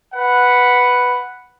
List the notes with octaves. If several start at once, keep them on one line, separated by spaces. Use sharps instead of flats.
B4 F#5